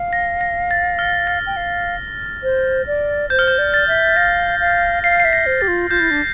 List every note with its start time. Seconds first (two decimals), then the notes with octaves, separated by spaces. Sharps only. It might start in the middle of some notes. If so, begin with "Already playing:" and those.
Already playing: F5
0.13 A#6
0.41 A#6
0.71 A6
0.99 F6
1.27 A6
1.47 G5
1.57 F5
2.43 C5
2.87 D5
3.30 C5 G6
3.39 F6
3.48 G6
3.58 D5
3.74 A6
3.88 E5
4.16 F5 A#6
4.60 F5
5.03 F5 C7
5.20 C7
5.25 E5
5.33 A#6
5.46 C5
5.61 G4 A6
5.68 F4
5.90 F4 G6
6.00 E4
6.11 D4